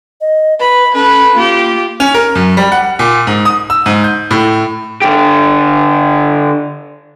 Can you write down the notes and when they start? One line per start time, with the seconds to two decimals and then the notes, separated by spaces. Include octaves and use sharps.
0.21 D#5
0.60 B4 B5
0.94 C#4 A4 B4
1.35 A#3 F4 G4
2.00 C#4
2.14 A#4
2.35 F#2
2.57 G3
2.72 F#5
2.99 A#2
3.27 G#2
3.45 D#6
3.70 E6
3.86 G#2
4.04 G6
4.31 A2
5.02 D3 G4